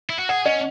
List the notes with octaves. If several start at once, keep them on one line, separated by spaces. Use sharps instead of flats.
E4
F#4
G#4 F#5
C#4 D#5